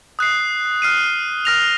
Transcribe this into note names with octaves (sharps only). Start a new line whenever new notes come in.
D#6 F#6 C7
F6 C7 D#7
F6 A#6 F7